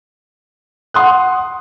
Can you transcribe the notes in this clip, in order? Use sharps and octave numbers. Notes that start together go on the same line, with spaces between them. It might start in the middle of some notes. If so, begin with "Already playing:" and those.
F#5 C6 D#6 F#6